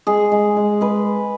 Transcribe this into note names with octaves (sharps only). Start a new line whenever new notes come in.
G#3 G#4
G#3
G#3
G#3 B4